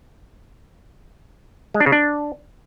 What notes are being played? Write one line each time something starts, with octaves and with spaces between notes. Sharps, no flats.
G#3
D4
C#3
D4